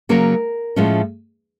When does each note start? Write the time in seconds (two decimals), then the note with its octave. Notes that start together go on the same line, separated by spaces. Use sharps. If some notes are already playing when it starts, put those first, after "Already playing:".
0.09 C#3 F#3 A#3 C#4 A#4
0.76 A2 F3 G#3 C#4